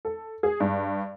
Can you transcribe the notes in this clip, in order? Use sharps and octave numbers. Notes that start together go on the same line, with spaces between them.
A4
G#4
G2